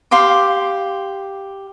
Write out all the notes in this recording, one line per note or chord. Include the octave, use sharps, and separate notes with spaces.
G4 F5 C6 D6